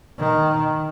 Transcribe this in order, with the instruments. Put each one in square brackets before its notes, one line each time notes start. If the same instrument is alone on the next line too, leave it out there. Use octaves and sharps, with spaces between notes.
[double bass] D#3